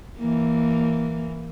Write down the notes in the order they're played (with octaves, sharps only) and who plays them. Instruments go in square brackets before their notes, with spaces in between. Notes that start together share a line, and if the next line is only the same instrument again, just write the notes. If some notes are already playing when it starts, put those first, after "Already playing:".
[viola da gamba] E3 A#3